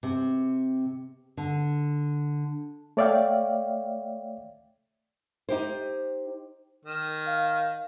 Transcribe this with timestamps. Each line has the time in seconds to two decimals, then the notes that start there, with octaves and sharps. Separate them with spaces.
0.03 C3
1.37 D3
2.97 A3 C#5 D5 E5 F5 G5
5.49 D#4 G4 C5
6.85 D#3
7.27 F5